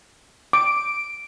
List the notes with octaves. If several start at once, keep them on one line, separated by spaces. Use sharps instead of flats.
D6 D7